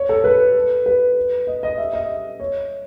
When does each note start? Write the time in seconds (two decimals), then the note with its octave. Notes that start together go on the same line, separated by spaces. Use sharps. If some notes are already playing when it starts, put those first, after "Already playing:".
Already playing: C#5
0.09 A4
0.24 B4
0.86 B4
1.47 D#5
1.63 D#5
1.78 E5
1.93 D#5
2.40 C#5